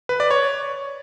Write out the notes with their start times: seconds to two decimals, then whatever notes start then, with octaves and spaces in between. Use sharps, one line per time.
0.09 B4
0.20 D5
0.31 C#5